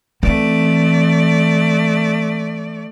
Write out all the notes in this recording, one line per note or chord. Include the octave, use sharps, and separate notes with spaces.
E3 A3 C4 D5